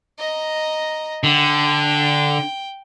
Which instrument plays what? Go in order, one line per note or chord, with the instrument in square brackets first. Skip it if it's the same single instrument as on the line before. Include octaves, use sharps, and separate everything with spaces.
[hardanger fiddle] D#5 A#5
[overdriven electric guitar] D3 [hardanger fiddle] G5